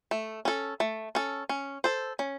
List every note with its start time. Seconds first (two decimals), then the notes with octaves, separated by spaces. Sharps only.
0.11 A3
0.45 C#4 A4
0.80 A3
1.15 C#4 A4
1.49 C#4
1.84 A4 C5
2.19 C#4